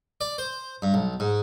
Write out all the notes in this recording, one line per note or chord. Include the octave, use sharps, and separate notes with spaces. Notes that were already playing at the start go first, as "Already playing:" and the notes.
D5
C5
G2
B1
G#2